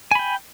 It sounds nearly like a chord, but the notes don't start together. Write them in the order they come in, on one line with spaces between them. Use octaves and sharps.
G#5 B5 G5